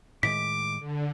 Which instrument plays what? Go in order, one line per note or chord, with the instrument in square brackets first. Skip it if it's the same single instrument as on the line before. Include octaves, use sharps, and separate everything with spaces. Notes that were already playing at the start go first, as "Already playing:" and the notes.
[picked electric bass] A2 D#3 G#3 [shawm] D6 [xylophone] B6
[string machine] D3